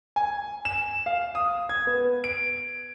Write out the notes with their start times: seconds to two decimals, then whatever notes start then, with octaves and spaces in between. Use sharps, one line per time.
0.16 G#5
0.65 E7
1.06 F5
1.35 D#6
1.69 G#6
1.87 B3
2.24 D7